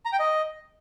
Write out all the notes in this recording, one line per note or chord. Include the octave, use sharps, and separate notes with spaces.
A#5
G5
D#5